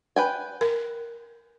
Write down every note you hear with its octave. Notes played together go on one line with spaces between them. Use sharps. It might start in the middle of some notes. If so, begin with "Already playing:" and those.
B4 G5 G#5
A#4